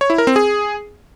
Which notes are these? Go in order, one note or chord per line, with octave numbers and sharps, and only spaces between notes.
C#5
E4
A#4
C4
G#4